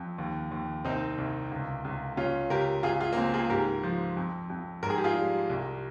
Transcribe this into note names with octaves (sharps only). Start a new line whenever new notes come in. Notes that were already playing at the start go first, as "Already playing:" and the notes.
Already playing: F2
D#2
D#2
C2 C4 D#4
C2
C#2
C#2
C#2 C#4 F4
C#2 G4 A#4
C#2 F4 G#4
F4 G#4
A#3
C#2 C4
F4 G#4
G#2 G4 A#4
F3
F2
F2
G#2 A#4
G#4
G4
F4 G#4
G3
C2